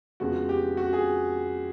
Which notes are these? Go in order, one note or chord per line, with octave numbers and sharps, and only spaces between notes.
F2 C#3 F3 G#3 B3 F#4
G4
F#4
G#4